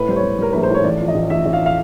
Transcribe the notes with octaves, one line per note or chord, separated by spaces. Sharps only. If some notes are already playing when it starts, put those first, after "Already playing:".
Already playing: A2 B4
G3 C5
C#5
G3
G3 A#4
A#1 B4
C5
A2 C#5
A1 D5
F3
D#5
A1
A1 E5
A1
F5
F5